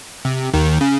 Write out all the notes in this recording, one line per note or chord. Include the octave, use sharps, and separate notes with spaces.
C3
D#2 D#3
C#3